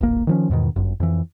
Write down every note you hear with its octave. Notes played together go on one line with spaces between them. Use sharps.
D1 G#1 A#3
D#3 F3 C#4
E2 G#2 B2 D#3
G1 F#2
F2 E3